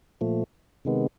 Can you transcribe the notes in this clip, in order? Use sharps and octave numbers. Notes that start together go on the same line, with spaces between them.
A#2 F3 A3
C3 D#3 G#3 B3